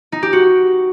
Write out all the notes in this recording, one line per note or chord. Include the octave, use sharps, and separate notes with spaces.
D#4
G4
F#4